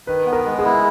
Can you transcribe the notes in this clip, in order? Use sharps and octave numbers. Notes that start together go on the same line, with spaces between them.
D#3 B4
B3
A#4
G#3
G#4
E4